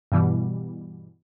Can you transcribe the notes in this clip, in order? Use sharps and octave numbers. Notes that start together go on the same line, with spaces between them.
G2 B2 E3 G3